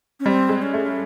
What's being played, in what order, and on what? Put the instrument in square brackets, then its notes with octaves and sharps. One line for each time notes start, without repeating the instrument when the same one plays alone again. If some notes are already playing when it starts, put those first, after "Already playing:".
[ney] C#4
[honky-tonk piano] G3 [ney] C4
[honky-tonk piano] G#3
[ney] C#4
[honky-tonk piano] A3